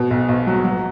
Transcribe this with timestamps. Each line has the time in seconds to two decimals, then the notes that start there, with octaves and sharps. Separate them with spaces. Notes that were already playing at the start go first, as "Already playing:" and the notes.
Already playing: B2
0.11 B1
0.29 B1
0.47 F#3
0.64 F#3